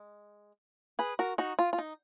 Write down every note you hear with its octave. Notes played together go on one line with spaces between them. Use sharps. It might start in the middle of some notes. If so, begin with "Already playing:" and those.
Already playing: G#3
G#4 B4
F#4 A#4
D#4 F#4
F4
F4
D#4